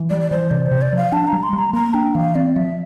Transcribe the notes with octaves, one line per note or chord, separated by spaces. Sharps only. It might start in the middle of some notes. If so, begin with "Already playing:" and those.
Already playing: E3
G3 D5
D5
E3 C5
C3 D5
C5
C3
D5
F3 F5
D4 A5
A#5
G3
C6
G3
A#5
A#3 A#5
D4 G5
E3 F5
C4 D5
F3 E5